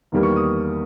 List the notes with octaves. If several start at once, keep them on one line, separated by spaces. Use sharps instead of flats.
E2 D#3 G3 A#3
C#6
D#6